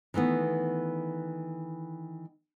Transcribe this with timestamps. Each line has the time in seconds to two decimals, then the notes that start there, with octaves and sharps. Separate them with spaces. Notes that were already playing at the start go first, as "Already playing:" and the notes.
0.14 D#3 E3 A3 B3